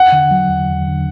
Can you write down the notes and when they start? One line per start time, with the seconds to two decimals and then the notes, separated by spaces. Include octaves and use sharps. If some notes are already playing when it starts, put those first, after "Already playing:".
Already playing: E2 F#5
0.12 D3
0.31 F#3
0.49 E2
0.68 E2
0.87 D3